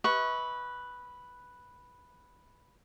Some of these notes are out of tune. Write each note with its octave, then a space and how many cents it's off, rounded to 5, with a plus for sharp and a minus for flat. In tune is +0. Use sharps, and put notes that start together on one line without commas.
B4 +0 E5 -40 C#6 +0